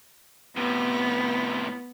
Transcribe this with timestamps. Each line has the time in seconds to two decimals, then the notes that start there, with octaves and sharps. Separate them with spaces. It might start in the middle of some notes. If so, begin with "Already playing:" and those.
0.57 A2 C3 B3